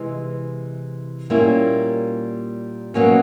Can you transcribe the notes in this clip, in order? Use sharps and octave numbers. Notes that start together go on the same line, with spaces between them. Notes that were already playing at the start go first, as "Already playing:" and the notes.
Already playing: C3 E3 G#3
A#2 G3 A#3 C#4 E4
B2 F#3 A#3 C#4